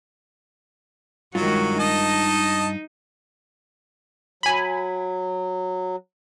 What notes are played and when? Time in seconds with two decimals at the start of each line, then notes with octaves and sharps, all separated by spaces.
1.35 G2 D#3 F#3 G#3 F4 F#4
1.79 D#4 D#5 A5
4.43 F#3 G#5 B5